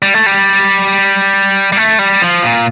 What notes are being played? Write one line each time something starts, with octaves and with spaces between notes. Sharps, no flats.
G3
A3
G3
G3
A3
G3
F3
A#2